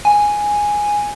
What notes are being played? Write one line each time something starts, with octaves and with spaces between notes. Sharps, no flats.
G#5